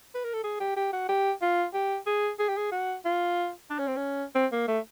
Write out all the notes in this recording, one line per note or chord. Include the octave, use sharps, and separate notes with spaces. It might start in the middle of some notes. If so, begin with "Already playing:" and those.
B4
A#4
A4
G#4
G4
G4
F#4
G4
F4
G4
G#4
G#4
G4
G#4
F#4
F4
D4
C#4
C4
C#4
C4
A#3
A3